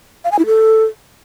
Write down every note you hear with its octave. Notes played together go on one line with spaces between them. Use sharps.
F5
G#5
E4
A4